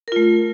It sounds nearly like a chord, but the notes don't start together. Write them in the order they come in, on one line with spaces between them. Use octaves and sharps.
A#4 F4 A3